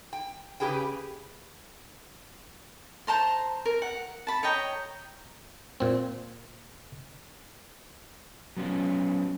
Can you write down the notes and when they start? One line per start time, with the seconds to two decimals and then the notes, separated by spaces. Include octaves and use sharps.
0.13 G5
0.60 C#3 G4 G#4 B4 G5
3.07 C5 A5 A#5 C6
3.65 A#4
3.82 F#5
4.27 A5 B5
4.43 C#5 D#5 G5 A#5
5.80 A#2 C4
8.57 F#3 B3 C#4 F4